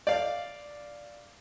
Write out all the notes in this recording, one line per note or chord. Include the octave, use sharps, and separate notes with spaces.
D5 F5